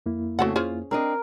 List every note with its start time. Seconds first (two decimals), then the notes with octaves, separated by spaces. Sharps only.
0.06 F2 A#3 E4
0.39 C#3 A3 C4 F#4 A4 F#5
0.56 C#4 F4 G#4 C5
0.91 C4 D4 A#4 D#5